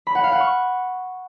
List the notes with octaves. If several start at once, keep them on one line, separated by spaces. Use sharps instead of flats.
B5
F#5
F5
F#5
C#6